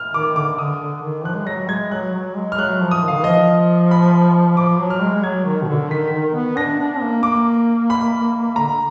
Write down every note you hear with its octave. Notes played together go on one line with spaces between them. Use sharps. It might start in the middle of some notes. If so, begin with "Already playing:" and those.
Already playing: F6
D#3 D6
D3 D6
D3 D#6
D3
D#3
F3 F#6
G#3
F#3 A#6
G#3 G#6
F#3 F#6
F#3
G#3
F6
F#3 F#6
F3
D#6
D#3
D3 F5
D#3
F3 D#5
B5
F3 D6
F#3
F6
G#3
G#3
F#3 G#6
D#3
B2
D3
D#3 B6
D#3
B3
D4 A#6
D4
A#3
A#3 D6
B5
D3 A#5